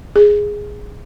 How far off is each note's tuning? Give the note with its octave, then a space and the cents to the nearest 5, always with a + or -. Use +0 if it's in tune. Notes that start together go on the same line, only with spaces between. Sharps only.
G#4 -5